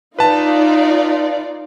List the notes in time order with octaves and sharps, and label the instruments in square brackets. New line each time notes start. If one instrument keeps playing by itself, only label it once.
[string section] D#4 F4 D5 [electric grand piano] B4 A5